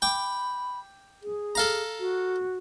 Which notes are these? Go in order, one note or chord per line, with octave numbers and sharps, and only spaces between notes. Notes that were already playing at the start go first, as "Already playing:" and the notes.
G5 B5 D6
G#4
A4 F5 A#5
F#4